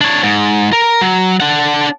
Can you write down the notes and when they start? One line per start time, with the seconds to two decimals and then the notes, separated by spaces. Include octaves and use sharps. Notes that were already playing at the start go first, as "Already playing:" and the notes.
0.01 D4 C#5
0.23 G#2
0.73 A#4
1.01 F#3
1.40 D4 F#5